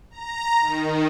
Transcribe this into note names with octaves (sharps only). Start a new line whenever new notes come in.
A#5
D#3